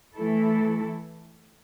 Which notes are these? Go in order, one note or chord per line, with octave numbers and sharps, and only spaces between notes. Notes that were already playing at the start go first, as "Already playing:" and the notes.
E3 A3 E4 A4